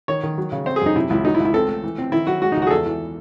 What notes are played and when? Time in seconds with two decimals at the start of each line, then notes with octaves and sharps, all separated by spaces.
0.08 D#3 C#5
0.23 D#3
0.38 F#3
0.52 C#3
0.66 C4 C5
0.76 G#4
0.81 F#2 D#4
0.96 C3 E4
1.10 C#2 E4
1.25 F#3 D#4
1.35 E4
1.40 C#2
1.45 E4
1.54 C4 A4
1.69 A3
1.83 E3
1.98 C4
2.12 D#3 E4
2.27 F#3 F#4
2.42 G#3 F#4
2.52 D#4
2.57 C#2
2.62 F#4
2.67 G#4
2.71 E2 A4
2.86 E3